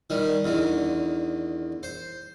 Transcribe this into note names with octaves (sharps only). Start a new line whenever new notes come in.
D#3 G3
E2 D3 D#3
C5